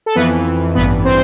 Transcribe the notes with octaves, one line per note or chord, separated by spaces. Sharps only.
A4
F2 E3 B3 B4
A1 G2 E3 B3 B4
C4 C5